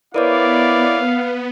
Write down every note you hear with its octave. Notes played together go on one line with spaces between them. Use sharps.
B3 E4 A#4 B4 C#5 D5 F5